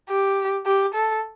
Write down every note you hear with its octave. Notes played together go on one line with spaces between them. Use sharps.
G4
G4
A4